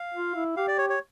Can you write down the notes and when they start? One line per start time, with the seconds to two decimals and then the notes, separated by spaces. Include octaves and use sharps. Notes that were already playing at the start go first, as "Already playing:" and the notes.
Already playing: F5
0.14 F4
0.35 E4
0.57 G4 F5
0.68 D5
0.78 C#5
0.90 C#5